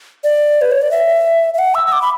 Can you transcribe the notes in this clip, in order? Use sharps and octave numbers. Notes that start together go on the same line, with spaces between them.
D5
B4
C#5
D5
E5
E5
F#5
E6
E6
D6
B5